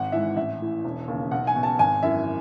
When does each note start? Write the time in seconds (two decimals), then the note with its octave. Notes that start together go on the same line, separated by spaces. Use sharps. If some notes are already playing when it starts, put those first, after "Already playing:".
Already playing: G#1 F#5
0.12 G#2 E3 E5
0.36 A1 E5
0.61 A2 E3
0.85 E1
1.08 D#2 C#3
1.31 B1 F#5
1.47 G#5
1.56 B2
1.63 A5
1.79 G#1 G#5
2.03 F#2 E3 E5